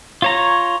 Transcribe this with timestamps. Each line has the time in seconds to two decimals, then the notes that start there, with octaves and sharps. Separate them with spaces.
0.22 F4 C#5 A#5